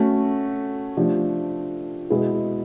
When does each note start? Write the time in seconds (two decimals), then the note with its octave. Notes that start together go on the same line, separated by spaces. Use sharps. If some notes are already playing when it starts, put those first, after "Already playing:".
Already playing: A3 C#4 F#4
0.97 F3 A3 D4 G4
2.10 B2 G#3 B3 E4 G#4